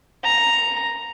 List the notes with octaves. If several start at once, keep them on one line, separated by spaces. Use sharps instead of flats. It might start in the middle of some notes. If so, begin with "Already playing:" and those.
A#5